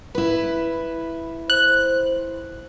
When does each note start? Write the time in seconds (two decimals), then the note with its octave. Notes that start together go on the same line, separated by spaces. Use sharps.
0.15 E4 B4
1.50 C5 F#6